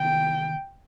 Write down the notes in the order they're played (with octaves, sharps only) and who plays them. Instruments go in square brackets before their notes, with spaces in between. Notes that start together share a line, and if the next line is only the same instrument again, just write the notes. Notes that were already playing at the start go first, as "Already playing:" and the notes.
Already playing: [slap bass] C3 D#3 B3 [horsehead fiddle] G5